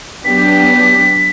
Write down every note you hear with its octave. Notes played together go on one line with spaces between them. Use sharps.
F#3 B3 D4 G4 B6